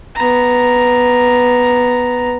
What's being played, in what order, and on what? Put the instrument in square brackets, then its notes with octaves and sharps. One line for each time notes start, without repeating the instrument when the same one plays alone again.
[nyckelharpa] B3 A#5